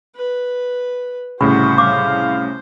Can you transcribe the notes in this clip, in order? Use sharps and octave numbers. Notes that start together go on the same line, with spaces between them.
B4
C2 A2 C#3 F#4 C5 B5
F5 D6